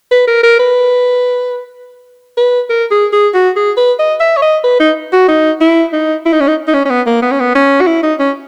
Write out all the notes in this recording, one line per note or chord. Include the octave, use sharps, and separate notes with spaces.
B4
A#4
A#4
B4
B4
A#4
G#4
G#4
F#4
G#4
B4
D#5
E5
C#5
D#5
B4
D#4
F#4
D#4
E4
D#4
E4
D#4
C#4
D#4
D#4
C#4
C#4
B3
A#3
B3
C#4
B3
C#4
F#4
E4
D#4
C#4